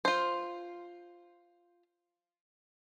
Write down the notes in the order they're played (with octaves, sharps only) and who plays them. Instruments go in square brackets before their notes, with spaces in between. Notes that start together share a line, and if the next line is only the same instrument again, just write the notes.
[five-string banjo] F4 C5